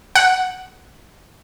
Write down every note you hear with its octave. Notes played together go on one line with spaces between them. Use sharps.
F#5